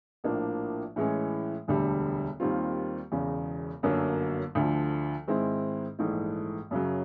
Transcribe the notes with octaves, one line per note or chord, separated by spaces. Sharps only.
A#1 A2 F3 A#3 D4
A2 E3 G#3 C#4
E1 D2 D3 G3
D#2 D#3 G3 C4 F4
E1 E2 C#3
G1 F#2 D3 F#3 A#3
D2 D3 F3
G#2 D#3 G#3 C4 E4
A#1 G#2 E3 A3
F#2 C#3 F#3